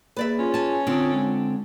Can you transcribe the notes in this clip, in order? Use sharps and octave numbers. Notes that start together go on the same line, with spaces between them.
A#3 G#4 B4 D5 E5
C#4 F4 G#4 C6
G#5 A5
D3 C4 D4 F4 D#6
G#3